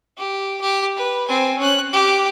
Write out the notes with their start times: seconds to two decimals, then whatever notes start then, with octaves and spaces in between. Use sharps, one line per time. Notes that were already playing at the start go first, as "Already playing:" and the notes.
0.18 G4
0.61 G4
0.96 B4
1.28 C4 G#5
1.59 C#4 F#6
1.93 G4